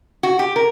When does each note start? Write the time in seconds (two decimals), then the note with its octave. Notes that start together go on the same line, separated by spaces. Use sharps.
0.23 F#4
0.39 G4
0.56 A#4